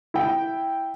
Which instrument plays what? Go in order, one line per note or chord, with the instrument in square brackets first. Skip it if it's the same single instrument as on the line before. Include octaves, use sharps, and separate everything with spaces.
[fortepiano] E4 G5